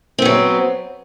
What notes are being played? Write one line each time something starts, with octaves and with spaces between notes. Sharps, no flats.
F#3 B3 C4